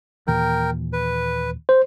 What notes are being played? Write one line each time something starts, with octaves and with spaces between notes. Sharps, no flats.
D#2 A#2 E3 A#4 G5
B4
C5